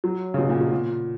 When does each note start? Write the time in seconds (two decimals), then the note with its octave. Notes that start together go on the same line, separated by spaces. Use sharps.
0.04 F#3
0.34 C#3
0.38 B2
0.49 A#2
0.60 B2
0.72 A#2